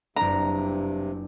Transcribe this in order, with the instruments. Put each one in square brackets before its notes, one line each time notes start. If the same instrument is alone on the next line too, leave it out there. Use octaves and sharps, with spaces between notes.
[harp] F#1 D4 [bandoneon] G2 C3 [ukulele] A#5